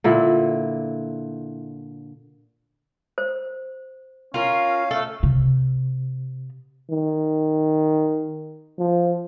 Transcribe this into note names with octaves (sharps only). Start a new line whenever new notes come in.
A#2 D3 E4
C5
C#4 F4 A#4 F5
A3 A4
C3
D#3
F3